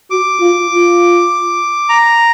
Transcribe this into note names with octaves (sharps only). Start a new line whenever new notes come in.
F#4 D6
F4
F4
A#5